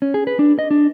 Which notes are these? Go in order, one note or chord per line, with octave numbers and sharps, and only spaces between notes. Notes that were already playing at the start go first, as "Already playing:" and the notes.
C#4
G#4
B4
D4
D#5
D4